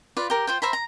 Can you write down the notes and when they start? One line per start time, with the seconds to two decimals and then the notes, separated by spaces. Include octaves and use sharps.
0.17 F4 B4 D5
0.30 G4 A#4
0.47 F4 C5 G5
0.62 C5 E5 A#5 B5
0.73 A#5